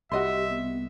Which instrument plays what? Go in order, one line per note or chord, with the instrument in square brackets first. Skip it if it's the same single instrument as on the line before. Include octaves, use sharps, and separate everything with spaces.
[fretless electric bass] C2 [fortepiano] F#4 D#5 C6 [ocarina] G4 [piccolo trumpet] E5
[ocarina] B3